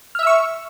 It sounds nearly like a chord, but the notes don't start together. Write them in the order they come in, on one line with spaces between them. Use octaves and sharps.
F6 E5 E6 C#6